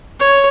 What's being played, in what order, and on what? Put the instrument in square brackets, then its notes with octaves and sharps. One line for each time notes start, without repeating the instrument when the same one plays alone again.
[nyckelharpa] C#5